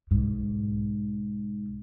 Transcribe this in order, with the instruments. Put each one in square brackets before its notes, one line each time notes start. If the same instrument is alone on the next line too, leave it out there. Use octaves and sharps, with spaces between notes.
[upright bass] B1 G#2